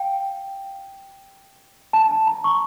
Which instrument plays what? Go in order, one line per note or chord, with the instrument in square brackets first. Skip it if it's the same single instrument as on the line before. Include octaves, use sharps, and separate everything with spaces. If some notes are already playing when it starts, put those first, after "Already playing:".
Already playing: [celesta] F5 G5
A5
A5
A#5
C#6